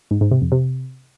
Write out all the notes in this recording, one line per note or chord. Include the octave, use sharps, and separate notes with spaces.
G#2
G#2
C3
F2
C3